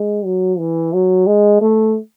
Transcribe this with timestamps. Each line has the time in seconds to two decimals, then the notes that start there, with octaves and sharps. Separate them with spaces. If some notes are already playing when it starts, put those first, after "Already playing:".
Already playing: G#3
0.25 F#3
0.59 E3
0.94 F#3
1.27 G#3
1.61 A3